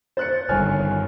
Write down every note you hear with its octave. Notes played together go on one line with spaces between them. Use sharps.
C5 F#6 A6 C#7
G1 G2 D3 D#3 C#5 G#5 F6